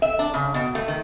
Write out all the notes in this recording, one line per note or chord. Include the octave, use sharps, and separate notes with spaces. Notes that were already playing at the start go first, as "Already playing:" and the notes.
E5
D4
C#3
B2
A3
D#3